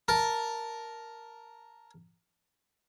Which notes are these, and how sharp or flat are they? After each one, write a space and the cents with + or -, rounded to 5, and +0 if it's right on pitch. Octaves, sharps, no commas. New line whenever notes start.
A#4 +0 A5 +0